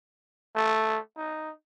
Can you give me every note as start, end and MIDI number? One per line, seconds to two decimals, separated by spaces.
0.56 0.98 57
1.17 1.51 63